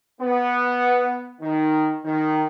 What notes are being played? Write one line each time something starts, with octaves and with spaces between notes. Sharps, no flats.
B3
D#3
D#3